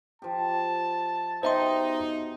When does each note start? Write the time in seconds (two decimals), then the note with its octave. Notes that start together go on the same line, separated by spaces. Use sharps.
0.22 F3 G4 A5
1.43 B2 D#4 G4 C5 E5 C6